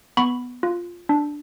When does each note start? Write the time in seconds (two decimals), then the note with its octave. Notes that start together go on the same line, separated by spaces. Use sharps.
0.17 B3 B5 C#6
0.63 F4
1.09 D4